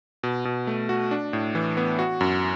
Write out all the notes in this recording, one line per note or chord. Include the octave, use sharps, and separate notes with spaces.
B2
B2
A3
F#4
D4
A2
E3
B3
F#4
F#2